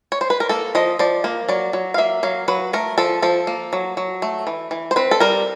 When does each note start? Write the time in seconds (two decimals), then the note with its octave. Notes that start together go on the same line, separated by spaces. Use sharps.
0.12 C#5
0.21 C5
0.30 B4
0.40 A#4
0.49 A#3 A4
0.75 F3 D#5
0.99 F3 D5
1.24 A#3
1.49 F#3 D5
1.73 F#3
1.94 F5
1.98 A#3 E5
2.23 F#3 F5
2.48 F#3 B4
2.73 A3 A#4
2.98 F3 A4
3.22 F3 A4
3.47 A#3
3.73 F#3
3.97 F#3
4.22 A3
4.47 E3
4.71 E3
4.91 C5
4.96 C4 B4
5.11 A4
5.20 G3 A#4